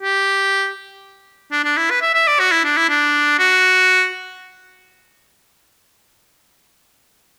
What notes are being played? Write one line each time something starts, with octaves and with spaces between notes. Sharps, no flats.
G4
D4
D4
E4
B4
E5
E5
D5
F#4
E4
D4
E4
D4
F#4